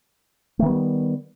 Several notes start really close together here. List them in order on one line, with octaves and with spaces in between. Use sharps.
A3 D#3 B3 G3